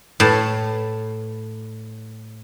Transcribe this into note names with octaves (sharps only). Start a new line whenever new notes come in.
A2 A5